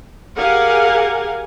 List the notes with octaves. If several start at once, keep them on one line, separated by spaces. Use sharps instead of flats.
G4 G#4 A#4 F5 F#5 G#5